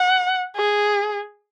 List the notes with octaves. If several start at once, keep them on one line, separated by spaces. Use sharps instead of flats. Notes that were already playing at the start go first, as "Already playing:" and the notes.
Already playing: F#5
G#4